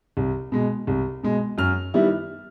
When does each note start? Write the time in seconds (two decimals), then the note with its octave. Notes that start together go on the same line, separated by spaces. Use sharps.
0.17 C2
0.52 B2 G#3
0.87 C2
1.23 B2 G#3
1.58 F#2 F6
1.94 D#3 G3 B3 E4